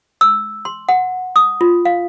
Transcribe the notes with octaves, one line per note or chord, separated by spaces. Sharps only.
E6
C6
F#5
D#6
F4
F5